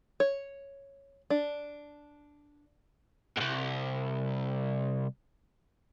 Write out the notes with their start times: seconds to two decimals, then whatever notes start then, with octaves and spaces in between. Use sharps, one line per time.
0.20 C#5
1.30 D4
3.37 C2 G#2